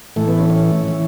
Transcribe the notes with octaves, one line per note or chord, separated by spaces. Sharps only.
A2 E3 A3
B3
C#4
C#4
E3